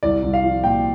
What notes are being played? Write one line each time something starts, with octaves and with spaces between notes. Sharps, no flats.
C2 D5
C2
F5
F3
A#2 G5